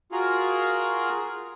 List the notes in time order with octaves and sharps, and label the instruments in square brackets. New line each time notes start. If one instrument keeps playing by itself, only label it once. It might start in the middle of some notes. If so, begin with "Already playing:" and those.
[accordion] F4 F#4 G#4 A#4